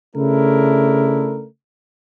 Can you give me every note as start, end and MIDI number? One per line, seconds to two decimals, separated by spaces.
0.15 1.45 49
0.15 1.45 57
0.15 1.45 62
0.15 1.45 64
0.15 1.45 70